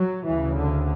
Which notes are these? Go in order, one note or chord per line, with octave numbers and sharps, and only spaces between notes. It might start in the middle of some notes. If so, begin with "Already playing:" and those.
Already playing: F#3
D2 C#3 E3
D3